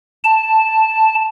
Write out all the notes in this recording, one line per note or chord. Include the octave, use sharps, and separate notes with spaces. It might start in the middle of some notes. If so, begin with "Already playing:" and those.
A5